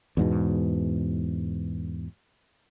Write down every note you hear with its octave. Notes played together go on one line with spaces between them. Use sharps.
E2 G#2 B2